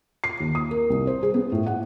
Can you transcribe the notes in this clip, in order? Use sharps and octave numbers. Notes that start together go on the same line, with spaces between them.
C7
D#2
D#6
A#4
C2
C5
G#4
B3
A2
F#5